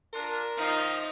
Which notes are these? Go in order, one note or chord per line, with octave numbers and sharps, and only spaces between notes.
D4 F4 A#4
D#3 F3 D#4 D#5